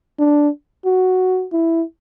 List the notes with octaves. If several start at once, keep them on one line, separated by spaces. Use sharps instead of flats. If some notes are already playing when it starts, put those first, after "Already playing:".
D4
F#4
E4